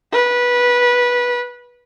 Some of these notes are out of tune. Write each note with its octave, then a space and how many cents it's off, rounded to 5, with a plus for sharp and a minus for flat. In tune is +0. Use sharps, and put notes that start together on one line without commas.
B4 -15